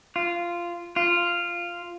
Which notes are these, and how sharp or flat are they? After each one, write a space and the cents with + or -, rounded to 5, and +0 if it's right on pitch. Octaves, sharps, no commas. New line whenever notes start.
F4 -10
F4 -5